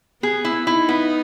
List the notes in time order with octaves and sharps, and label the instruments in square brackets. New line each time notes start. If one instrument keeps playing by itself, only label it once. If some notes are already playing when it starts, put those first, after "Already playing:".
[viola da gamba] B3 [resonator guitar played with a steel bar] G#4
[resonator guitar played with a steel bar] E4
[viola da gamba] D#4 [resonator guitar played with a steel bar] E4
[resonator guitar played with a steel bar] B3